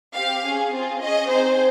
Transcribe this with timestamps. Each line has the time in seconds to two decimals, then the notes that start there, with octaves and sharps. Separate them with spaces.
0.15 C4 G4 F5
0.44 C#4 G#4
0.72 C4 F4 G#4
1.00 C#4 G#4 D#5
1.30 C4 D#4 G#4 C5